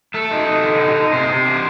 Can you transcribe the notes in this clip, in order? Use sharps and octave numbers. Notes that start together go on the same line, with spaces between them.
A3 A4
D#4
D#4
D3
D#4
D#4
C3 C5
C3
D4